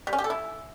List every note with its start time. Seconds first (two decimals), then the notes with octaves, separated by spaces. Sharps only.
0.07 G3
0.13 C#4
0.18 G4
0.24 A4
0.30 E4